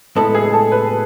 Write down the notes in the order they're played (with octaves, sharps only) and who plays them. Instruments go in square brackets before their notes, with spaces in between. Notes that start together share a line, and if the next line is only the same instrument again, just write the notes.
[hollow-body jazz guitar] A2 G#3 B3 E4 [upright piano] A4
[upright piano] G#4
A4
B4